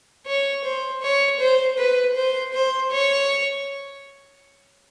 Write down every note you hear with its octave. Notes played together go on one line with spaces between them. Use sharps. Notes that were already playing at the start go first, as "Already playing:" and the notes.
C#5
C5
C#5
C5
B4
C5
C5
C#5